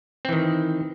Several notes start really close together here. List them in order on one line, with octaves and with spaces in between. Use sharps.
C4 E3 D#3